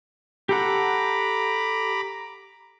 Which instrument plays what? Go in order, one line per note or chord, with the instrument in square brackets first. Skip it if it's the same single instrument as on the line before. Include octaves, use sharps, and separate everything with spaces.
[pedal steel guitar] G4 A4 F#5 [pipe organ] A#5 B5 D6